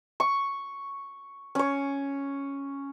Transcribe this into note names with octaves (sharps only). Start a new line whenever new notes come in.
C#6
C#4 C#5